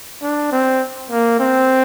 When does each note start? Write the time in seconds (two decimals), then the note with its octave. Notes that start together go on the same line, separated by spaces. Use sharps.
0.22 D4
0.52 C4
1.11 A#3
1.40 C4